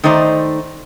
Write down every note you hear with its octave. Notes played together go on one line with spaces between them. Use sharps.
D#3 A3 D#4 C5 D5